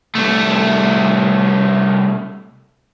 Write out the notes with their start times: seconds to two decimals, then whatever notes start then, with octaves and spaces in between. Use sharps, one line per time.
0.15 C2 A3